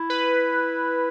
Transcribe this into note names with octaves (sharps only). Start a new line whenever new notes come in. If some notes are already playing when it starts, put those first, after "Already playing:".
Already playing: E4
B4